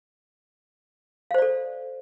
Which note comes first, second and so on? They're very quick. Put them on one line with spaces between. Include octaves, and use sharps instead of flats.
F5 C5 D5 A4